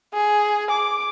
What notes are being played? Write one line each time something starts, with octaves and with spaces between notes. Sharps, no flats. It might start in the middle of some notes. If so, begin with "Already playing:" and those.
G#4
D6